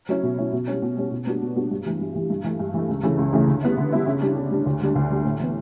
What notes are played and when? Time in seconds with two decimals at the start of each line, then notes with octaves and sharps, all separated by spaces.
0.09 F#3 C#4 E4
0.23 B2
0.38 F#3 C#4 E4
0.53 B2
0.68 G3 C#4
0.82 B2
0.97 G3 C#4
1.12 B2
1.26 G3 B3 D4 F#4
1.41 B2
1.56 G3 B3 D4 F#4
1.71 G2
1.86 E3 G3
2.01 G2
2.15 E3 G3
2.30 G2
2.44 E3 A3
2.59 G2
2.74 E3 A3
2.89 C#2
3.03 C#3 E3 A3
3.18 C#2
3.33 C#3 E3 A3
3.47 D3
3.63 G3 B3 E4
3.77 D3
3.92 G3 B3 E4
4.07 C#3
4.21 G3 D4
4.36 C#3
4.51 G3 D4
4.66 D2
4.81 D3 G3 D4
4.95 D2
5.10 D3 G3 D4
5.25 A2
5.40 E3 B3